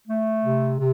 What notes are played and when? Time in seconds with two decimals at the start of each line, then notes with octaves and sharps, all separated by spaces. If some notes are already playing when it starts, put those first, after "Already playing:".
0.08 A3
0.43 C3
0.77 C3